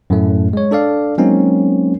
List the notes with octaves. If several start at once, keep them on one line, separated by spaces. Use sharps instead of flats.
F#2 A2 A3
G#3 C#5
D4 A4 D5 F5
F#3 G#3 A#3 C4 C#4 D#4